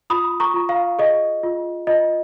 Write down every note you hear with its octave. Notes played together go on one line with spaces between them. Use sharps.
F4 B5 D#6
A#5 C#6
F4
F5
G#4 D#5
F4
F4 D#5